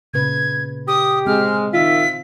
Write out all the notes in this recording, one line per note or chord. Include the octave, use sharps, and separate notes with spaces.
A#2 C#3 B4 G#6
G4 D#6
G#3 C4 F6
D#3 F4 E5 B6